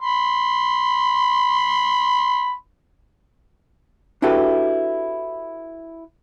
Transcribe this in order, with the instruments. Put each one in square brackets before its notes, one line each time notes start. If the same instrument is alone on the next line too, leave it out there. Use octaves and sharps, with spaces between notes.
[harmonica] B5 C6
[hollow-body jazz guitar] D4 E4 F#4 G4 A4 B4